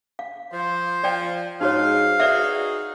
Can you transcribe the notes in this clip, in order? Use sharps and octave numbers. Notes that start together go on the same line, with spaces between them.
F5
F3 C5
F3 D5 G5
G#2 D#4 F#4 C#5 F5
D#4 F#4 G#4 B4 D5 E5